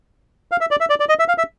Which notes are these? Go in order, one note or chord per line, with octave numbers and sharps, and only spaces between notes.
F5
E5
D5
E5
D5
D5
D#5
E5
F5
E5